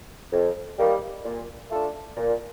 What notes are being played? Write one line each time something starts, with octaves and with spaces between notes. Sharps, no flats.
F2
D#3 G3 A#3
A#2
A3 D4 F4 A4
A#2